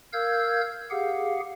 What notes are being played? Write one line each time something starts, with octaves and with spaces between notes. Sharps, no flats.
A#4 F5 E6 G6 G#6
G4 G#4 F5 F#5